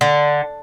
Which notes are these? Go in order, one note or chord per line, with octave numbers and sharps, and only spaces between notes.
D3